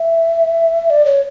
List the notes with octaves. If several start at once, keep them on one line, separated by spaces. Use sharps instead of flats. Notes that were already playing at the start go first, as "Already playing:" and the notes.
Already playing: E5
D5
C#5